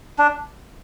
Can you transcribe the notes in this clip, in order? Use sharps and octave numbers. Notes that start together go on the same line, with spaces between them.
D4